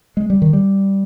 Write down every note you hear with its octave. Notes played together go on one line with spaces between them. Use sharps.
G#3
G3
D#3
G3